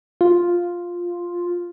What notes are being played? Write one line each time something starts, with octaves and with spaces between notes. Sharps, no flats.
F4